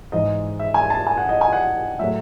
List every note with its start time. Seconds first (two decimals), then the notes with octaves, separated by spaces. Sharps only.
0.12 G#2 E3 G#3 D#5
0.60 E5
0.74 G#5
0.90 A5
1.07 G#5
1.18 F#5
1.29 D#5
1.41 G#5
1.53 F#5
1.99 A2 F#3 A3 E5